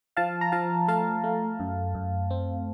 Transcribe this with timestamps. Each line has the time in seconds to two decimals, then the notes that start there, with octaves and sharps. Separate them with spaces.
0.17 F3 F5 A5
0.41 A#5
0.52 F3 F5 A5
0.88 A3 F5 A5
1.24 A3
1.60 F#2
1.95 F#2
2.30 C4